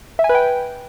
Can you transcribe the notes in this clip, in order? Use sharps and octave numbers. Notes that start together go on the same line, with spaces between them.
E5
G#5
B4
G5